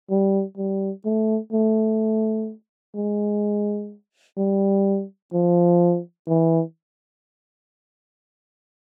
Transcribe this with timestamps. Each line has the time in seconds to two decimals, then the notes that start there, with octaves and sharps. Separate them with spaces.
0.10 G3
0.57 G3
1.05 A3
1.53 A3
2.95 G#3
4.37 G3
5.33 F3
6.28 E3